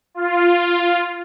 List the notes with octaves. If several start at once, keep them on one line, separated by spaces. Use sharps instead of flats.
F4